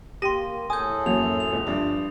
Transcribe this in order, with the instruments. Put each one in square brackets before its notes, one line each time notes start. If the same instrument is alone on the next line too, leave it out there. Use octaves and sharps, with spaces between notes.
[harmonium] A#3 [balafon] G4 G5 [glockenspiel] C6 A#6 [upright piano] D#7
[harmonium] A2 G#4 A4 [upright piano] G#5 [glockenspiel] D#6 G6
[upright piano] F#2 [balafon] A#3 F#4 [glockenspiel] F7
[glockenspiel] F7
[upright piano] C#2
[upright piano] G2 F3 D4 [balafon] E5